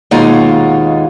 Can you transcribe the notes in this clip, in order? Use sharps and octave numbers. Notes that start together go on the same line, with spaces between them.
D#2 B2 G#3 D#4 F4 F#4